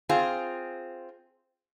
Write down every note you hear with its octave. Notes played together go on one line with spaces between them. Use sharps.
C4 F4 G#4